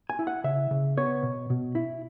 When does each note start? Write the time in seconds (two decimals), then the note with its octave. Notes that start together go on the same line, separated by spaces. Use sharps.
0.10 G#5
0.19 E4
0.27 F#5
0.44 C#3 E5
0.71 C#3
0.97 B3 C#5
1.23 B2
1.50 B2
1.75 E4